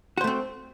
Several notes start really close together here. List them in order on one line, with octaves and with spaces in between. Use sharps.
F#4 C5 A3 C4